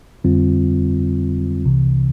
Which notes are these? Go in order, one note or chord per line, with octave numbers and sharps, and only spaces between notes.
F2 D3 G3 C4 F4
C2 C3 E3